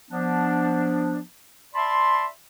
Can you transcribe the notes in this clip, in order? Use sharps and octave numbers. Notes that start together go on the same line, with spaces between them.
F3 B3 D4
D5 E5 A5 B5 C6